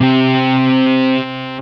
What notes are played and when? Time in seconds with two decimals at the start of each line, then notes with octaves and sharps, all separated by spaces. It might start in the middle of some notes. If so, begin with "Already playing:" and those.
0.01 C3 G4